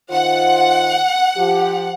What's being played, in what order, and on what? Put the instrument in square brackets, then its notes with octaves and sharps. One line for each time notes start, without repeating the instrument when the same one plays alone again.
[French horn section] D#3 F4 C5 [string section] F#5
[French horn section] F3 G4